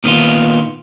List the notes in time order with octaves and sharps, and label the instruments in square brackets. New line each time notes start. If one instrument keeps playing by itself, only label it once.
[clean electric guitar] A#2 D#3 B3 F4